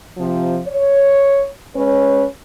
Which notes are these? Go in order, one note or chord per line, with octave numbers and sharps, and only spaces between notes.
C3 F3
C#5
G#3 C#4 B4 C#5